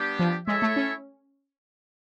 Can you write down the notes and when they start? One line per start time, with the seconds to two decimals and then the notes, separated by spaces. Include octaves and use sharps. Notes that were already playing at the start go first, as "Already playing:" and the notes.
Already playing: G3 B3 D4 G4
0.19 F3
0.47 G#3 E4 A4 C#5 E5
0.62 A3
0.76 C#4